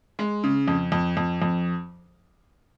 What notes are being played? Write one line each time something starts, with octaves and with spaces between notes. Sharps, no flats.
G#3
C#3
F2
F2
F2
F2